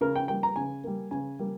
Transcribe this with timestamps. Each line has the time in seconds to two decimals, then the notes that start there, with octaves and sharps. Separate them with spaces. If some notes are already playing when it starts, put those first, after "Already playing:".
0.01 C#3 A#4
0.16 G5
0.28 G3 A#3 G5
0.43 A#5
0.56 C#3 G#5
0.84 G3 A#3
1.11 C#3 G#5
1.39 G3 A#3